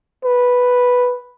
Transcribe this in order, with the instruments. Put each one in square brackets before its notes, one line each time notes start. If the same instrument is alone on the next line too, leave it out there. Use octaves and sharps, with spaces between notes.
[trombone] B4